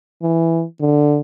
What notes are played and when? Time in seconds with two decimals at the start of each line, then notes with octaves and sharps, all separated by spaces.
0.22 E3
0.81 D3